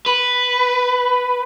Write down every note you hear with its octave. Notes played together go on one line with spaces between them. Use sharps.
B4